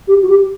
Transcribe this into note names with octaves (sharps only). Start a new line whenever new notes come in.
G4
F#4
G4